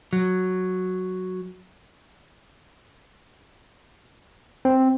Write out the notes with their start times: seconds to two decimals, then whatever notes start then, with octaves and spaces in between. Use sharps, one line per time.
0.13 F#3
4.65 C4